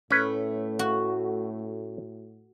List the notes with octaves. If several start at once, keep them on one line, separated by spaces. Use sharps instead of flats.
A2 A3 C#4 B4
F#4